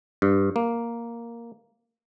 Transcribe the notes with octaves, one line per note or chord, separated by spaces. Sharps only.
G2
A#3